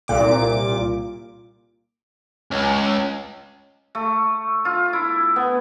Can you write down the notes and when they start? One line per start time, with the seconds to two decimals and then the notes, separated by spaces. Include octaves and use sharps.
0.08 C2 A#2 D6
2.51 C#2
3.95 A3
4.65 F4
4.93 E4
5.36 B3